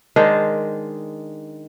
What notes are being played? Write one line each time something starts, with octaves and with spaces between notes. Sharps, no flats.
D#3 G#3 D4 C5